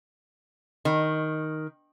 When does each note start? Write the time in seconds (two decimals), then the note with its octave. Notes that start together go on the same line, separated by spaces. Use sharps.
0.85 D#3